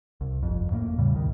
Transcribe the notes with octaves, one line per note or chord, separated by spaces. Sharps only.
C2
G1 F2
F2 A2 A3 A#3
E2 A2 C#3 G3
C2 B2 D#3